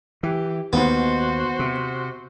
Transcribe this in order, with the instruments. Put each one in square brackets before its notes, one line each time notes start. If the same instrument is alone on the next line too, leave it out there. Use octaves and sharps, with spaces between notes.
[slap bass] E3 [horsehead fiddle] G4
[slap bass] D#2 D#3 [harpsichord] B3 [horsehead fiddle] F#4 C5
[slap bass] C3